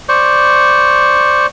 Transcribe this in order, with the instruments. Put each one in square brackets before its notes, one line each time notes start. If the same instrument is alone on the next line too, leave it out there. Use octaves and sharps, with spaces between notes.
[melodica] C5 D5 C#6